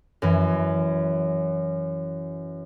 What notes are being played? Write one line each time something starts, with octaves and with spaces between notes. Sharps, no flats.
F#2 E3